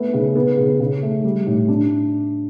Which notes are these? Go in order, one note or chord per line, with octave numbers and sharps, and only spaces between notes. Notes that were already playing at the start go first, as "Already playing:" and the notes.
Already playing: A3 B3
C#3
B3
C#3
C#3
A3
G3
A2
D4